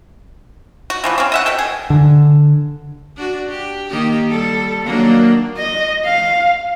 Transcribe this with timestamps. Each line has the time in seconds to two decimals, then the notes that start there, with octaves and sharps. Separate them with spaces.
0.90 F#4
1.04 E3 F3 B3
1.18 C4 C#4
1.32 D#5 E5 F#5
1.46 B2 A4 G5
1.59 G#4
1.90 D3
3.17 D4 F#4
3.49 G4
3.90 D#3 A#3 G4
4.30 G3 A4
4.86 D#3 F#3 A#3 D4
5.57 D#5
6.05 F5